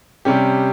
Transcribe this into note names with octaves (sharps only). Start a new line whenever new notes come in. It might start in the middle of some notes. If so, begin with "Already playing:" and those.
C3 G3 C#4 G4